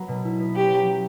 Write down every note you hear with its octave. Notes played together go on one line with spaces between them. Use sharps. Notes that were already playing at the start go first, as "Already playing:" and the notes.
Already playing: F#3 B3
B2
E4
B3
C#4 G4
F#3
F#3